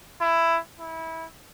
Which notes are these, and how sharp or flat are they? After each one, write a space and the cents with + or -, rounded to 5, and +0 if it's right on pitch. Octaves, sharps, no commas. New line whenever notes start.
E4 +10
E4 -20